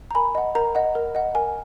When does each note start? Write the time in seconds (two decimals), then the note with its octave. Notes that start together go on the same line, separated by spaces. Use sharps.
0.11 A#5
0.15 A#4 G#5 B5
0.35 D#5 F#5
0.55 A#4 A#5
0.75 D#5 F#5
0.95 A#4
1.15 D#5 F#5
1.35 A#4 G#5